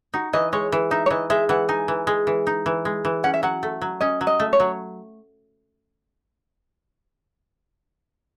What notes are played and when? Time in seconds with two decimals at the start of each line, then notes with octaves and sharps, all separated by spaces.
0.14 D#4 F#4
0.33 E3 D#5
0.53 G#3 C#5
0.72 E3
0.91 D#4 E5
1.06 C#5
1.10 E3 D#5
1.30 G#3 E5
1.49 E3 F#5
1.69 D#4 G#5
1.88 E3
2.07 G#3
2.27 E3
2.47 D#4
2.66 E3
2.85 G#3
3.05 E3
3.24 C#4 F#5
3.34 E5
3.43 F#3 F#5
3.63 A3
3.82 F#3
4.01 C#4 D#5
4.21 F#3
4.27 D#5
4.40 A3
4.53 C#5
4.60 F#3